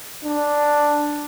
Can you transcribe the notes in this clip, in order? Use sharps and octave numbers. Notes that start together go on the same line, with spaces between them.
D4